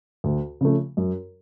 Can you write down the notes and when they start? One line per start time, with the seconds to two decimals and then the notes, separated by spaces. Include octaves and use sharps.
0.24 D2
0.61 C#3 F3 A3
0.97 F#2